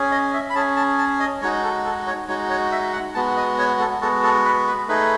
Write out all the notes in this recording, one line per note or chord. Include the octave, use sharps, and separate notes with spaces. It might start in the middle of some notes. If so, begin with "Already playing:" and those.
Already playing: C#4 G#4
D#5
E5
B5
C#4 G#4 A5
A5
A5
D#5
G#3 D#4 F#4 C#5
A4
A4
C#5
G#3 D#4 F#4 C#5
C#5
E5
F#5
G#3 B3 F#4 A5
D#5
C#5
A4
G#3 B3 F#4 A4
A4
B4
B4
A3 D#4 G#4 B4